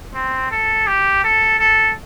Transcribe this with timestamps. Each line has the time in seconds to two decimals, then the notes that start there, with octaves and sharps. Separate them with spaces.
0.15 C4
0.52 A4
0.87 G4
1.24 A4
1.59 A4